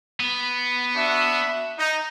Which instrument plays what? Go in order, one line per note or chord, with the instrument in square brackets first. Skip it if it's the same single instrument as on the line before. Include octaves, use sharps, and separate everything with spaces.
[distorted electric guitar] B3
[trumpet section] D4 F#4 E5
D#4